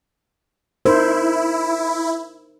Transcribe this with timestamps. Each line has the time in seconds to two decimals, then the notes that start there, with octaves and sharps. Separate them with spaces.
0.85 D#4 E4 A#4 C5